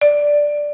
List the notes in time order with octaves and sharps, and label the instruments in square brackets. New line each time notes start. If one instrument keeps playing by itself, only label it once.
[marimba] D5